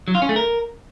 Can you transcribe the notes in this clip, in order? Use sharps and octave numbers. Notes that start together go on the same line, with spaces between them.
F#3
F4
C#4
A3
A#4